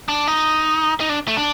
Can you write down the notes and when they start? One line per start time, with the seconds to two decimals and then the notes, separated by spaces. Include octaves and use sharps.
0.08 D4
0.27 D#4
1.00 D#4
1.09 D4
1.28 A3
1.37 D4